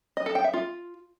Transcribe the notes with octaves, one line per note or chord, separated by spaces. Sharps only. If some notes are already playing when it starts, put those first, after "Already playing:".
D#5
A4
G5
E5
F4